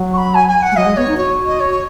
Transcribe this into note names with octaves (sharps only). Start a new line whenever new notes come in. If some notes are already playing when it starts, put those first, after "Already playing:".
Already playing: F#3
C#6
B5
G#5
G#5
F#5
G#3
F#3 D#5
G#3
B3 C#5
D#4
F#4 C#5
D#5
C#5